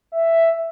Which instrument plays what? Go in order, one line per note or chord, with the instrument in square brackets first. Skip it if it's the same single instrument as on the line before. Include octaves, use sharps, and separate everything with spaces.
[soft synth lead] E5